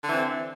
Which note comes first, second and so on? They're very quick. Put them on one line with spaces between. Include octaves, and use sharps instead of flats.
D3 E3 C4